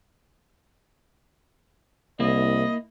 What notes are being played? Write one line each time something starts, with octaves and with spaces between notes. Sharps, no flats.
C2 A#3 E4 D#5